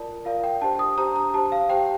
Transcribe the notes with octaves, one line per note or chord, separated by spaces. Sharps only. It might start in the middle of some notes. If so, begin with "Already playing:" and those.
Already playing: F4 A#4 D5 A5
F4 A#4 D5 F5
G5
D4 G4 C5 A5
D#6
D4 G4 C5 A#5
A#5
G4 C5 A5
F5
G4 C5 G5